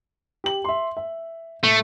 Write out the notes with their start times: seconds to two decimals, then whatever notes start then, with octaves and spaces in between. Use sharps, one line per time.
0.44 G4 F#7
0.64 E5 C6
0.97 E5
1.64 A2 A3